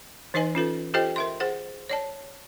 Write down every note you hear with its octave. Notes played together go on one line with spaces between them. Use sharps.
E3 D#4 B4 D#5 G#5
C#4 F4 A4 B4
F4 G4 A4 C5 D#5 G5
A#4 E5 C6
G#4 C5 F#5
C#5 D5 A5